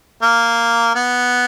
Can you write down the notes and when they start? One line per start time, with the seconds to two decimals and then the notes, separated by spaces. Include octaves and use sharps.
0.22 A#3
0.95 B3